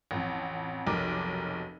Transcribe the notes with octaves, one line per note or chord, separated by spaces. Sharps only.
A1 F2
F1 B1 A#4 D6